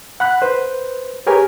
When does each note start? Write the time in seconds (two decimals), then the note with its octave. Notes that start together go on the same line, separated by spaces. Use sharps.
0.20 F#5 B5 F#6
0.42 B4 C5
1.27 G4 G#4 A#4 B4 C#5 G#5